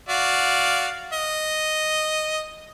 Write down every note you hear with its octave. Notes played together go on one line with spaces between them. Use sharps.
F#4 D5 F5
D#5